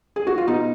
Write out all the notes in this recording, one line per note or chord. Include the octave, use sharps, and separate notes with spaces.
G#4
F#4
F4
B2 D#4